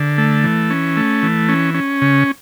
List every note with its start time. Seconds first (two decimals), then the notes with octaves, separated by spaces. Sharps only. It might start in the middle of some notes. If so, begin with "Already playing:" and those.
Already playing: D3
0.18 A3
0.44 E3
0.70 C#4
0.97 A3
1.23 E3
1.49 C#4
1.74 C#4
2.02 C#3